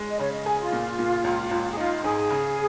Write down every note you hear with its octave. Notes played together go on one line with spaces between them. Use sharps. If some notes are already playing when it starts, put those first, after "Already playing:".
Already playing: G#3
D#5
C#3 C#5
D#5
G#4 G#5
F4
A#2
A#2
C#2
C#2
G#4
D#4 F4
G#2 G#4
C#3